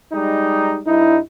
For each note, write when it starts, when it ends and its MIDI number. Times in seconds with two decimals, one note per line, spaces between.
0.13 0.81 55
0.13 0.81 56
0.13 0.81 63
0.87 1.18 43
0.87 1.18 63
0.87 1.20 64